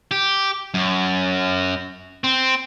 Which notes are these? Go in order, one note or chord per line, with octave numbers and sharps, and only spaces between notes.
G4
F#2
C4